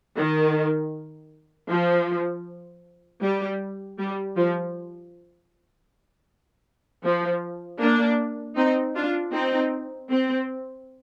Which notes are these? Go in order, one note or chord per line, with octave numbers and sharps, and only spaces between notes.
D#3
F3
G3
G3
F3
F3
A#3 D4
C4 D#4
D4 F4
C4 D#4
C4